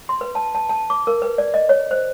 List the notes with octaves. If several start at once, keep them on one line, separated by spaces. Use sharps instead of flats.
C6
B4
A5
A5
A5
D6
A#4
B4
D5
D#5
C#5
C5